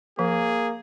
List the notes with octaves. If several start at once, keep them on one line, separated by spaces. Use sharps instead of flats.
F3 A#3 G#4